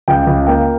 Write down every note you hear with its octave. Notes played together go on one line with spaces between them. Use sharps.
C#2 G5
C#2
A#3 G5